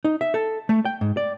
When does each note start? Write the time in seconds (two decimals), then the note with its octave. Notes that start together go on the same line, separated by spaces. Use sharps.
0.04 D#4
0.21 E5
0.34 A4
0.69 A3
0.85 G5
1.01 G#2
1.17 D5